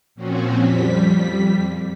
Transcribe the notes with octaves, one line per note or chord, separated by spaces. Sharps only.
A#2 F3 C4 C#4 F#4
F2 G3 B6